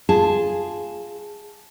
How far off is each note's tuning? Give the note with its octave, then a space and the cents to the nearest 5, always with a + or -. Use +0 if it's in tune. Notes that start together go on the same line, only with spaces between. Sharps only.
F4 +0 G#4 -5 A5 -5